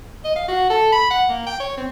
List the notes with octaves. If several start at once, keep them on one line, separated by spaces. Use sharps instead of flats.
D#5
F5
F#4
A4
B5
F#5
A#3
G5
C#5
C4